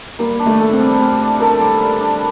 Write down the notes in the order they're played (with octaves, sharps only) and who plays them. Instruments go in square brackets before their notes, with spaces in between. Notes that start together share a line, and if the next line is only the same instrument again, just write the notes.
[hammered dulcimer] G3 [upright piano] A#3
[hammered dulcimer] D4
[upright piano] A3
[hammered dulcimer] A4
[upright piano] C4
[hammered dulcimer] G3
G3
D4
[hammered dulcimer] A4 [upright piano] A#4
[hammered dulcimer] G3
G3
D4